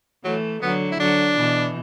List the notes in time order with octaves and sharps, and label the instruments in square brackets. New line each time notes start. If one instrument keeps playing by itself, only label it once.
[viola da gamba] E3 A3 [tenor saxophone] F#3
[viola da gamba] D3 F#3 [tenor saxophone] B3
[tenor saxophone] E4
[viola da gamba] D3 F#3 [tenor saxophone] D4
[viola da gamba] B2 E3